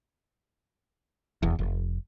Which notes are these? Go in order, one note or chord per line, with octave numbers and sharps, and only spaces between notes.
D#1 E2
F1